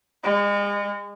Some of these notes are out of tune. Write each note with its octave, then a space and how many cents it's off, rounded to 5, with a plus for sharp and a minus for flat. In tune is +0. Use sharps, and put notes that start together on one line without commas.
G#3 -35